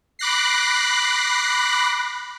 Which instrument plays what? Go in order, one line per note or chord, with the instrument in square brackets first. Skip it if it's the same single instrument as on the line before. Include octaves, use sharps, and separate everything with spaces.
[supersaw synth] B5 D6 F#6 A#6 C7